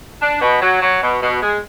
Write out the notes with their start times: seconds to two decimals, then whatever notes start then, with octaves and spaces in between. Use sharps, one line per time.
0.22 D4
0.41 B2
0.62 F#3
0.81 F#3
1.03 B2
1.22 B2
1.42 G#3